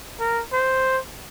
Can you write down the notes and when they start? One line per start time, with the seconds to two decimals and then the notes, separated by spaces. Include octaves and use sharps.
0.20 A#4
0.53 C5